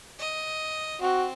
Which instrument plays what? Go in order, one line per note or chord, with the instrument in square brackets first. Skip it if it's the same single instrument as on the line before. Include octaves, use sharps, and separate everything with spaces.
[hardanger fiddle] D#5
[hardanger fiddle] C4 [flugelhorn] F#4